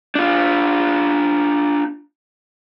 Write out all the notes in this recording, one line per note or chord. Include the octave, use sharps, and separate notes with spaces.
D4 F4